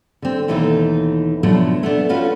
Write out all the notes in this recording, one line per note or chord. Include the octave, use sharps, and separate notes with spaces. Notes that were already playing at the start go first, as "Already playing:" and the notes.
D3 C4
D#2 B2 E3 A3 D#4
B2 D3 F3 F#3 A3
A3 B3 D4
A3 C#4 F4 F#4 B4